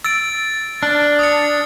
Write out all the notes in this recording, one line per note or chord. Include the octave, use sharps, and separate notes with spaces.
E6 A6 D7
D4 F6
D#6 A6 C#7